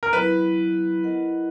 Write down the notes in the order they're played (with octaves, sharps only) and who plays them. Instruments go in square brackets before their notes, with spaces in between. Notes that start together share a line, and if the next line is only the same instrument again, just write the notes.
[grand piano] A#4
[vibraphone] F#3 B3 E4 [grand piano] B4
[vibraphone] E4 A#4 D#5 F#5